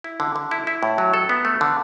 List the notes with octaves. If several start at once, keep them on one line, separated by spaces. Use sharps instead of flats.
E4
D3
D3
E4
E4
A2
F#3
A4
B3
A3
D3